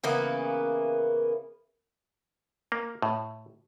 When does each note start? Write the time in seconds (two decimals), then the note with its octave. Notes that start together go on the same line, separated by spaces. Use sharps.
0.04 C#3 E3 A#3 B3
2.72 A#3
3.02 A2